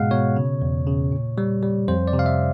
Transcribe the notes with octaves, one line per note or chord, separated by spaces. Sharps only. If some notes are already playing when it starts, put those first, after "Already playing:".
Already playing: G#2 B2 G#3 F5 F#5
B2 C#5
C#3
E2
C#3
A#2
G3
G3
F2 C5
D5
C3
F5
E5